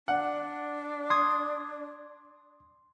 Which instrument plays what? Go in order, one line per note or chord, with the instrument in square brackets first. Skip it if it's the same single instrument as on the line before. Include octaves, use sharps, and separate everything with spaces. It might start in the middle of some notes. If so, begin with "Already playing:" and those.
[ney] D4 [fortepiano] F#5
[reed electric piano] C6 [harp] D#6 G#6